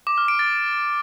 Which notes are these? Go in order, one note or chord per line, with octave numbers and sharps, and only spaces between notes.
D6
F6
D7
A6